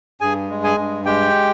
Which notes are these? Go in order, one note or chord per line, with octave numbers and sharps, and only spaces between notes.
G2 G#4 G#5
G#3
G#4 G#5
G2
G#3 G4 G5